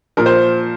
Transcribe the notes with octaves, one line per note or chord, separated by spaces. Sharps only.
A#2 F3 A#4
C5